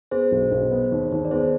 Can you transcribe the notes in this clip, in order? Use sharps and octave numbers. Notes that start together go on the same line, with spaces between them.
B3 G#4 C5
B1
B1
B3
D#2
D#2
D5
B3 G#4 C5